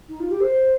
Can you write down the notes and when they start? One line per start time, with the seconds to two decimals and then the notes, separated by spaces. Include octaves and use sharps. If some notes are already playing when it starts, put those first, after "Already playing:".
0.09 D#4
0.20 F4
0.30 G4
0.40 C5